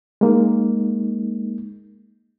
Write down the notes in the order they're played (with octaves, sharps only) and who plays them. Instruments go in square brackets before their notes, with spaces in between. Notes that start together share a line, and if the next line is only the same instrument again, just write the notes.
[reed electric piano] G#3 A#3 D#4